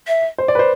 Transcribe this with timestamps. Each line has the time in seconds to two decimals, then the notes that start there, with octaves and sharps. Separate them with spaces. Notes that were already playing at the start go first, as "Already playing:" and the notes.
0.08 E5
0.38 C5
0.48 D5
0.55 B4
0.59 C5